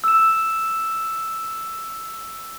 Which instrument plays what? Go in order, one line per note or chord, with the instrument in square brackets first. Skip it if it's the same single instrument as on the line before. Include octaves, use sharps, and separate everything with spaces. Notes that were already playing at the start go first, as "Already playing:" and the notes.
[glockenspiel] E6 E7